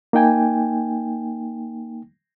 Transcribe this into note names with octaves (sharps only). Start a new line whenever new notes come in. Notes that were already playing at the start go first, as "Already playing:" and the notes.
A#3 D#4 G5 G#5